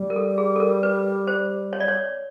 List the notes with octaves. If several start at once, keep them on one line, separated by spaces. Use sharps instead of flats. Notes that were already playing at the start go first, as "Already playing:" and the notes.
Already playing: G3
A#4
A4
G#4
A4
A#4
B4
C5
C#5
D5
C#5